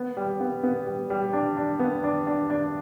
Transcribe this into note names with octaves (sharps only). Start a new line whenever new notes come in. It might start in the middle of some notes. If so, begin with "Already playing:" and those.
Already playing: B3
G3
B3
B3
G3
G3
D4
D4
B3
D4
D4
D4